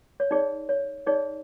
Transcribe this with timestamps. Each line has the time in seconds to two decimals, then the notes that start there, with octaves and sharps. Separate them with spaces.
0.20 C#5
0.31 D#4 G#4 C#5 D5
0.69 C#5
1.06 D#4 G#4 C#5 D5